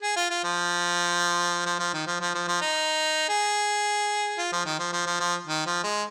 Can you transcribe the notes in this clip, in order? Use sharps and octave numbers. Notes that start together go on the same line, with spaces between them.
G#4
F4
F4
F3
F3
F3
D#3
F3
F3
F3
F3
D#4
G#4
F4
F3
D#3
F3
F3
F3
F3
D#3
F3
G#3